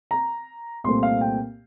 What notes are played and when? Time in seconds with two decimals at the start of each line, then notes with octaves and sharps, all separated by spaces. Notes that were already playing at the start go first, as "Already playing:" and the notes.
0.11 A#5
0.84 C2 A#2 A3 C4 C6
1.03 F5
1.21 G5